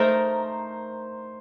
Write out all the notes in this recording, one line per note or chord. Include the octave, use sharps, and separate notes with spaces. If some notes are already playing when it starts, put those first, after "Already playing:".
Already playing: A3 D#4 A#4 C5